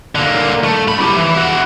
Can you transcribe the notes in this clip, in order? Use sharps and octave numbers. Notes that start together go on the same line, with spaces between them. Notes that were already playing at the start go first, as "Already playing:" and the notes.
D3 A#3
A3
F#2 B5
E4 G4
E3
E4 F#4